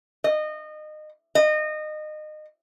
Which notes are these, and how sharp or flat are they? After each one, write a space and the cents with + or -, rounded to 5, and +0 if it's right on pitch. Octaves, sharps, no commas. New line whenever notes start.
D#5 -25
D#5 -25